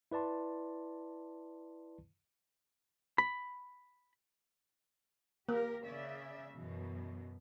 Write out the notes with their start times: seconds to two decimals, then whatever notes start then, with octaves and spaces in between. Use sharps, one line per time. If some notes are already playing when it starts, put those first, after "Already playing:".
0.11 E4 B4 D5 A5 C6
3.18 B5
5.49 A#3 G4 A#4
5.84 C#3 D5 E5
6.52 F#2 B2 E3